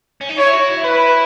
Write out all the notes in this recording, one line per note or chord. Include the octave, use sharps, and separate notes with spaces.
C#4
D#4
E4 C#5
F#4
E4
E4 B4